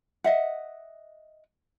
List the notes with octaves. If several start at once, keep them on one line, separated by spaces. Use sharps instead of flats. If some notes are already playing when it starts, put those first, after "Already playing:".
D#5 E5 F#5